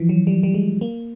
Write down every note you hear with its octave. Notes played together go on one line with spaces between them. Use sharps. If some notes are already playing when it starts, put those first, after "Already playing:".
Already playing: E3 F3
F#3
G3
G3
G#3
A#3